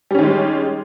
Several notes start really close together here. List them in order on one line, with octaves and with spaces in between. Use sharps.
G3 C#4 D#3 G#3